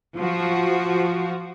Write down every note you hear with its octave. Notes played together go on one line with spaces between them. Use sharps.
F3 F#4